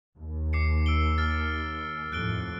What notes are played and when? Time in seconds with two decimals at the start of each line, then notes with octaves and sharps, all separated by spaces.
0.19 D#2
0.53 D6 C7 C#7
0.86 E6 D7 G7
1.18 F6 A6
2.12 F2 A2 F#6 D7 G7